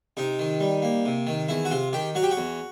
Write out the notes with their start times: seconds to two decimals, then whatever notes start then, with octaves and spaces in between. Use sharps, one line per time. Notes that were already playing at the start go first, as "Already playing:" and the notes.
0.17 C3 D#4
0.39 D#3
0.60 G3
0.82 A#3
1.05 C3
1.27 D#3
1.49 E2 E4
1.65 F#4
1.71 C3 F4
1.93 D#3 G4
2.15 F#3 F#4
2.23 G4
2.31 F#4
2.37 E2